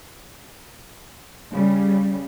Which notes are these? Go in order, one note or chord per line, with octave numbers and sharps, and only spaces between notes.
C#3 G3